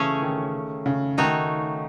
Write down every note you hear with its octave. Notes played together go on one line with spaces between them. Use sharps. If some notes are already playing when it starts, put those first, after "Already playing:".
Already playing: C#3 E3 A3 C#4 G#4 C#5
D#3
C#3
D#3 A3 D#4 F#4 C#5